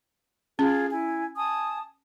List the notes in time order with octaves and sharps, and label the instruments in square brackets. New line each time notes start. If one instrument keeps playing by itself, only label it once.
[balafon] C#4 [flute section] F4 G#4
[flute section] E4 G#5
G#5 A5 D#6